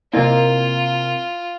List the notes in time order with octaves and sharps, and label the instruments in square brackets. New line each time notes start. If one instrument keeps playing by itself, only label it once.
[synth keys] C3 A#3 [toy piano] E4 A#4 D#5 [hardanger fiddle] F4